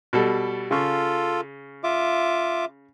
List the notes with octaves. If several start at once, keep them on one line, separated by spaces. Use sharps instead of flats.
B2 G3 A4
C#3 F4 A4 C#6
F4 E5 D6